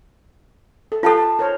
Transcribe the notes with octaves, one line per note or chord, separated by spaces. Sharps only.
A4
F4 A4 B4 F5 G5 A5
A5
A#4 C5 C#5